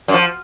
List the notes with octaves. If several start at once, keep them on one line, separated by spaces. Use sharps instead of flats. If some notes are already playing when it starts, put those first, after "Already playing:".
F#2
F3